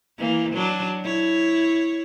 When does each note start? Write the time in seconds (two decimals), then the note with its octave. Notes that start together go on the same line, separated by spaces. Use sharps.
0.18 E3 A#3
0.53 F#3 D4
1.04 E4 C#5